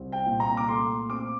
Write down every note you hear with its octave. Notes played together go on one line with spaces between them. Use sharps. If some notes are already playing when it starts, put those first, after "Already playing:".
Already playing: C2 C4
G5
A#2
A#5
D6
A3 C6
C4 D6